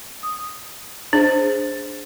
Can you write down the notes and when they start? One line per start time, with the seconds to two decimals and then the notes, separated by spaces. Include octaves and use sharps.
0.23 D#6
1.13 D4 G#4 C5